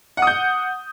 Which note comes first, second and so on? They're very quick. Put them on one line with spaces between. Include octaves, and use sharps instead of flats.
F#5 D#6 G6